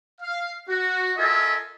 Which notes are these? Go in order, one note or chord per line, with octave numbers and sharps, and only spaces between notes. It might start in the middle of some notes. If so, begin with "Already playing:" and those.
F5
F#4
F4 A4 A#4 D#5 E5 G#5